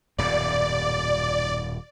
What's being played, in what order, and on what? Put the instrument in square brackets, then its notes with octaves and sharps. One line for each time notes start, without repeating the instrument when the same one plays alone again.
[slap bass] D#1 F#2 B2 [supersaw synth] D5